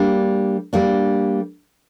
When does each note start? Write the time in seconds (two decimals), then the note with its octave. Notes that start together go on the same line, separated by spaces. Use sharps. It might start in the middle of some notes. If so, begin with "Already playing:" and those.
Already playing: G3 A#3 D4
0.73 G3 A#3 D4